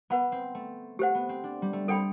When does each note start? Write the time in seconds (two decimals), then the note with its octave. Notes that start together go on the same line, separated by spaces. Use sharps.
0.10 B3 B4 F#5 B5
0.32 C4
0.55 A3
0.99 A3 G4 C5 F#5
1.15 B3
1.29 C4
1.44 D4
1.62 G3
1.73 A3
1.88 C4 A4 D5 G5 B5